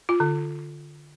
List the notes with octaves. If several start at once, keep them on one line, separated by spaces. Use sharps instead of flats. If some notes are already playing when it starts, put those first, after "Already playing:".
F4
D3